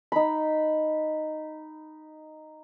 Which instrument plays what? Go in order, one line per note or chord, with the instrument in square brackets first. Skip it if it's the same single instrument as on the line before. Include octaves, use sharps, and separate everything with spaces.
[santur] D#4 B5